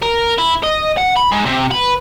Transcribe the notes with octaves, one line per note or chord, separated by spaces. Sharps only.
A#4
E4
D#5
F#5
B5
G#2
C3
B4